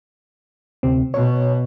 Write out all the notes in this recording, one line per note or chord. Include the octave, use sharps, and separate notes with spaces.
D2 C3 C4
B2 C#5